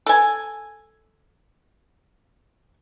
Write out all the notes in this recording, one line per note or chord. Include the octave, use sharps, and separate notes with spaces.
A4 G#5